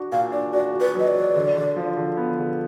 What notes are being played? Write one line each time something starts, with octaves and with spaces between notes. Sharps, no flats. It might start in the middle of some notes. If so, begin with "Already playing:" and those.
Already playing: D4 F#4
A#2 F5
D4 D5
F#4 D5
F#4
B4
F#3 D#5
D5
F#3
D3
D3
F3
D3
B3
D3